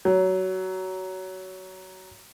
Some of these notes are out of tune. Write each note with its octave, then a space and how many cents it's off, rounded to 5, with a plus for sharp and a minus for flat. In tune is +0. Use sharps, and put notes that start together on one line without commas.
F#3 +15